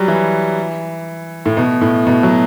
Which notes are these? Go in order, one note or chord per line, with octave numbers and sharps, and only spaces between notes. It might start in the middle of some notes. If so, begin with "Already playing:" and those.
Already playing: F#3 G3
E3
A2
B2
A2
B2
F#3